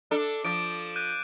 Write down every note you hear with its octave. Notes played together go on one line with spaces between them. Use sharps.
D4 A4
F3 D6 A6 D7
F#6 G6 D#7